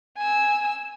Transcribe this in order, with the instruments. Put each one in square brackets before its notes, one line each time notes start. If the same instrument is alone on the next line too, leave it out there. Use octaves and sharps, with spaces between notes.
[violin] G#5 E6